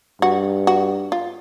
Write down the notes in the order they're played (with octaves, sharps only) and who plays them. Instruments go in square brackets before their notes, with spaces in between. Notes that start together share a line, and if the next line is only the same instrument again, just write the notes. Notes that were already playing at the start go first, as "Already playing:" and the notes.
[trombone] G2 [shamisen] F#4
[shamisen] F#4
F4